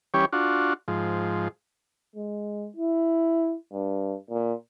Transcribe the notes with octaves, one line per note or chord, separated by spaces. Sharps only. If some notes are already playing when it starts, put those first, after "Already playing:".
E3 G3 C#4 G4 C#5
D4 F4 F#4
G#2 F3
G#3
E4
G2
A#2